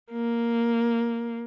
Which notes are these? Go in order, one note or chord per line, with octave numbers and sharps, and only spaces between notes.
A#3